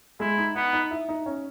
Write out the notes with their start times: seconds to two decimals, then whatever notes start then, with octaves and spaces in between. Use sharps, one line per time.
0.20 G#3 E4
0.38 D#4
0.55 B3 D#4
0.73 D#4
0.91 E4
1.09 D#4
1.26 C#4